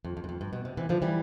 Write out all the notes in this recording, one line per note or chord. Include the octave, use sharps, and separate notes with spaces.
F2
F2
G2
F2
G2
B2
C3
C3 E3
D3 F3
E3 G3